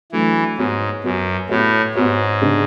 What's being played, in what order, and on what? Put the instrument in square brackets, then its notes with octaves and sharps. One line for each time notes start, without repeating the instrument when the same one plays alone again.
[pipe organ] E3 [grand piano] F#3 A3 D4 A4
[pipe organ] G#2 [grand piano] B3 F#4 C#5
[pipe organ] F#2 [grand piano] B3 F#4 C#5
[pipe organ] A2 [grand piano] B3 F#4 C#5
[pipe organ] G#2 [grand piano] B3 F#4 C#5
[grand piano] C#3 G#3 D4 G#4